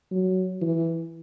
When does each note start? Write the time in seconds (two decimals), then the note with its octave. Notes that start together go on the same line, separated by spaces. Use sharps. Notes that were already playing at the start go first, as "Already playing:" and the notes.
0.11 F#3
0.61 E3